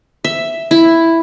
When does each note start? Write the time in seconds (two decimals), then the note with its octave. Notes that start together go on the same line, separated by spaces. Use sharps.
0.25 E5
0.71 E4